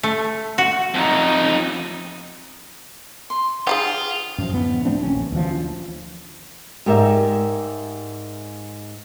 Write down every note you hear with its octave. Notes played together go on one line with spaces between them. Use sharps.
A3
F#4
F2 D#4
C6
F4 G#4 F5 G5
F#2 F3
D1 B3
F3 A3 C4 D4
A#1 D#2 C#4
D2 E3 F3
G#2 G4 A#4 D5 E5